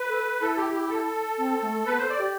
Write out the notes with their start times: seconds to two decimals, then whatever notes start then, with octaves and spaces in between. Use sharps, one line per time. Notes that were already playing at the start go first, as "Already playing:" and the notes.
Already playing: B4
0.09 A4
0.41 E4 A4
0.57 G4
0.73 G4
0.89 A4
1.38 C4
1.62 A3
1.86 B3 B4
1.98 A4 C5
2.10 D5
2.18 G4